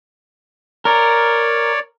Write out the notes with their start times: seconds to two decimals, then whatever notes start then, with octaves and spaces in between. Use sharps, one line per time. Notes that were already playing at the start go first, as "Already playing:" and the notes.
0.85 A#4 C#5 D5